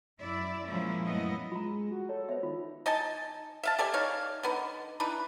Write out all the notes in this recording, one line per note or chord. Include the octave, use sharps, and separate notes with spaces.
F#2 E4 D5 E5
A#2 F3 G#3 A#3 C#4 E4
F#2 F3 A3 B3 E4 D#5
G#3 F4 A#5
F#4
A4 C#5
B3 C5 C#5 E5
D#3 F4
D#4 D#5 G#5 A5
E5 F5 A5
G4 A4 D5 G#5
D#4 C#5 F5
D3 B3 D#4
E3 D4 D#4 B4